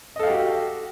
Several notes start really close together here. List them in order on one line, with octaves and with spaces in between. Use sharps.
D#5 A4 F5 G4 F#4